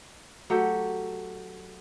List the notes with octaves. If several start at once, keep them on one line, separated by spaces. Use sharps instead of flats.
F#3 A3 G4